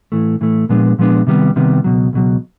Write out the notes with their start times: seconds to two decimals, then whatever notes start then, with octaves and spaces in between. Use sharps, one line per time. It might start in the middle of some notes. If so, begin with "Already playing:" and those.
0.12 A2 E3 A3
0.41 A2 E3 A3
0.69 A#2 F3 G#3 B3 D4
0.99 A#2 F3 G#3 B3 D4
1.27 C3 D#3 G3 B3
1.56 C3 D#3 G3 B3
1.84 C#2 B2 F#3
2.13 C#2 B2 F#3